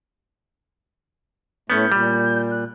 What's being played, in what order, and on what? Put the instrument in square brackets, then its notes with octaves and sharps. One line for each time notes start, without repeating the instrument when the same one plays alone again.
[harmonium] A2 A3 [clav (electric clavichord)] B3 C#4 [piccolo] G6
[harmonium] A#2 [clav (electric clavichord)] G3
[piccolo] F#6